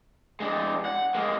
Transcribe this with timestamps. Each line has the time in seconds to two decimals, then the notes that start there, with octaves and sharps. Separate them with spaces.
0.40 G#3 D4
0.85 F#5
1.15 G#3 A#3